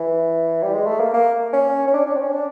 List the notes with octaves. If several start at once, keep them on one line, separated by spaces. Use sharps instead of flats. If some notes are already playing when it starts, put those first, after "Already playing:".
Already playing: E3
G3
G#3
A3
A#3
A#3
C#4
C#4
D4
D4
C4
C#4
D4